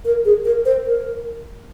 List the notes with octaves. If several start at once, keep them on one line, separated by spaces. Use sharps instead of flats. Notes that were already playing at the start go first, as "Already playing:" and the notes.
A#4
G#4
A#4
C5
A#4